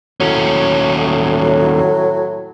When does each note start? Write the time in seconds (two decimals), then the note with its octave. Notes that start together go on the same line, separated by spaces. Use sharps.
0.20 D#2 A2 F#3 C#4